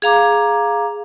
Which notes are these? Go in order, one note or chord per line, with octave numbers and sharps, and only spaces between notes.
G#4 F5 A#5 D6